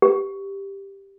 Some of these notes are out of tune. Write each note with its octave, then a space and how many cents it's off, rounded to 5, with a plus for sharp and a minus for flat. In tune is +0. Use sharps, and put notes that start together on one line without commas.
G4 +5